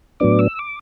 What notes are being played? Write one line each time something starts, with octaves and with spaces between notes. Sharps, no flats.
A2 F#3 B3 D4 D6
E6
D6